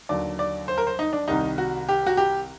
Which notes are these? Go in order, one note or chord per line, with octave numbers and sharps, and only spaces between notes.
D#2 D3 F#3 D5
D5
C5
A#4
C5
D#4
D4
C2 C3 D#3 G3 D#4
F#4
G4
F#4
G4